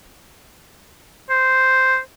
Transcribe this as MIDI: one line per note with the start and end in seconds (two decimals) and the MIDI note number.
1.30 1.98 72